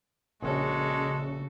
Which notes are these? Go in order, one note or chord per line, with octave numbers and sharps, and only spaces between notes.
A#1 C#3 G#3 C#4 F#4 A4